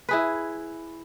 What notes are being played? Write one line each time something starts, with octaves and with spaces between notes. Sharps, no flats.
E4 G#4 B4